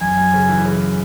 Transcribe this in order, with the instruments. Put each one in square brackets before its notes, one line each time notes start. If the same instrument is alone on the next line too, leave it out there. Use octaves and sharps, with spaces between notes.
[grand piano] F#2 [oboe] G#5
[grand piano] F#2
C#3
E3
C#3